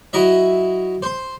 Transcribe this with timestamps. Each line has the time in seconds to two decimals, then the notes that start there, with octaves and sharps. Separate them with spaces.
0.13 F#3 E4 D#5 E5
1.03 C5 C6